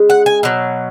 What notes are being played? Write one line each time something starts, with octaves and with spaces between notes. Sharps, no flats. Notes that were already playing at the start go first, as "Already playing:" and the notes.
Already playing: C#3 G#3
F#5
G#5
B2 F#3